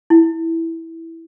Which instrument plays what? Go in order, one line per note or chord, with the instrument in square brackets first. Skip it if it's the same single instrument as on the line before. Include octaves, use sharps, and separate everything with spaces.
[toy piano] E4